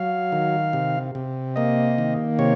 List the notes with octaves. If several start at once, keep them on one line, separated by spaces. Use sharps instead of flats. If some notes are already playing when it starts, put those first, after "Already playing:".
Already playing: F#3 F5
D#3
C3
C3
A#3 D#5
D#3
C3 C#5